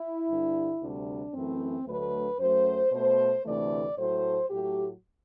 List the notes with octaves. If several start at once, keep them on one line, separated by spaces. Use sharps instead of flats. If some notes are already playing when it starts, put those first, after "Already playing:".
Already playing: E4
G2 D3 G3
D2 C3 G3 D4
F#2 E3 A3 C4
D2 D3 F#3 A3 B4
F#2 F#3 A3 C5
B2 A3 C5
D2 C3 E3 A3 D5
A2 F#3 A3 C5
A2 F#3 A3 G4